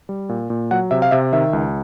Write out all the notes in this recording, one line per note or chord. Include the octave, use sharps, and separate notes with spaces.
G3
A#2
A#2
F#3 F#5
C3 E5
F5
C3 E5
D#3 E5
C#2